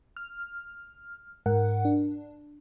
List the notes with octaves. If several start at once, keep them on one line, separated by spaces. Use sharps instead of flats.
F6
G#2 A#4 F#5
D4